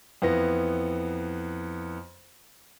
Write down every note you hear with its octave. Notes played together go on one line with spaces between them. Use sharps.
F2 E3 B3 A#6